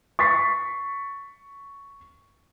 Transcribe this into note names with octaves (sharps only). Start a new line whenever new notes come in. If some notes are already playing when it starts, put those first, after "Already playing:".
C#6 A6 B6 C7